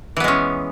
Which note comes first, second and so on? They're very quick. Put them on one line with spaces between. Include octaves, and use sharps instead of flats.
E3 B3 G#3 C#4